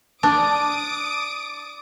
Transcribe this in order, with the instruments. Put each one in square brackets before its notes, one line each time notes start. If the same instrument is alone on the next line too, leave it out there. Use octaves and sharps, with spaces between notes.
[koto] D4 [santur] D5 [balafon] A5 [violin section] D6 D#6 D7